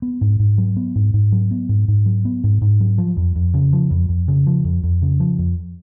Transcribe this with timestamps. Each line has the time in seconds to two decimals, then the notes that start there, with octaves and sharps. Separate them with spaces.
0.02 B3
0.21 G#2
0.39 G#2
0.58 F#3
0.76 B3
0.95 G#2
1.14 G#2
1.32 F#3
1.51 B3
1.69 G#2
1.88 G#2
2.06 F#3
2.25 B3
2.44 G#2
2.62 G#2
2.80 F#3
2.98 F3
3.17 F2
3.36 F2
3.54 C#3
3.73 F3
3.91 F2
4.09 F2
4.28 C#3
4.47 F3
4.65 F2
4.83 F2
5.02 C#3
5.20 F3
5.38 F2